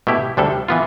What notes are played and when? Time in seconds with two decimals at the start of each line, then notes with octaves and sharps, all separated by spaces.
0.07 B2 A3 E4 G4
0.37 D2 C3 G3 D4 A4
0.68 E3 B3 F4